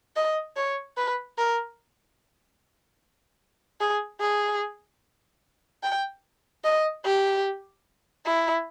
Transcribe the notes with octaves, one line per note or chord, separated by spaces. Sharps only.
D#5
C#5
B4
A#4
G#4
G#4
G5
D#5
G4
E4